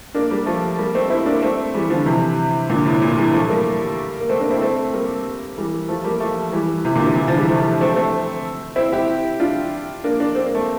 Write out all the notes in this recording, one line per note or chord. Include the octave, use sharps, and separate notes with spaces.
A#3 D4
G3 A#3
F3 A3
G3 A#3
A3 C4
C4 E4
A#3 D4
A3 C4
E3 G3
D3 F3
C3 E3
A#2 D3
A2 C3
A#2
E3 G3
F3 A3
G3 A#3
A#3
A3 C4
A#3 D4
C4 E4
A3 C4
G3 A#3
E3 G3
F3 A3
G3 A#3
F3 A3
E3 G3
C3 E3
A#2 D3
C3 E3
C3 E3
D3 F3
E3 G3
F3 A3
A3 C4
A3 C4
C4 E4
E4 G4
D4 F4
A#3 D4
A#3 D4
C4
A#3
A3